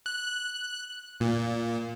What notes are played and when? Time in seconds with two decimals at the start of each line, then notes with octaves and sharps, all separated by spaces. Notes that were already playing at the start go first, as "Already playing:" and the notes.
0.06 F#6
1.20 A#2